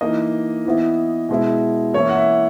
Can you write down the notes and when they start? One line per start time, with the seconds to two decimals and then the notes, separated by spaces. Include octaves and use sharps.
0.01 E3 A#3 D#4 D#5
0.65 E3 B3 E4
1.29 B2 G#3 B3 E4
1.93 E3 A#3 C#4 E4 C#5
2.09 F#5
2.16 E5